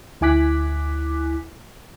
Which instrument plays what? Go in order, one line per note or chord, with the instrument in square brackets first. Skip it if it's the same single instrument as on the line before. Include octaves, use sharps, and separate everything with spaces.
[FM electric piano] D2 E4 G#5 D6 F#6 B6